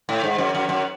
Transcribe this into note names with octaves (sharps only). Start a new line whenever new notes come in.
A2
G#2
F#2
F#2
F#2